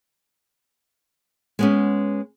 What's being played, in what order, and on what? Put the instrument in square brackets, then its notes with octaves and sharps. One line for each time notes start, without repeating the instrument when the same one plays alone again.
[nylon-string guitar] G#3 B3 C#4